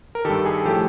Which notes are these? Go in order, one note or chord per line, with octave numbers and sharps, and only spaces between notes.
A#4
G2 D#3 G4 A4
G#4
A2 F3 G4 A4